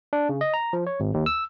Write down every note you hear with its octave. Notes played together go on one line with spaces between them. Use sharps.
D4
C#3
D#5
A#5
F3
C#5
G#1
D#2
E6